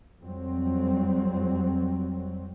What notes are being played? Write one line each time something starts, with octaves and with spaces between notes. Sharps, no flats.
F2 F#3 G3 C4